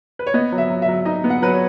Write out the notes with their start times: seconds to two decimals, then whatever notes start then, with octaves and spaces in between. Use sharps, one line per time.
0.19 B4
0.27 C#5
0.34 B3 D#5
0.52 F#3
0.58 E5
0.70 F#3
0.82 E5
0.88 F#3
1.05 D#4 D#5
1.24 B3
1.30 F#5
1.42 F#3 B4
1.54 C#5